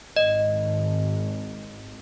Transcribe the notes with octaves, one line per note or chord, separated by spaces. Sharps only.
G#1 D#5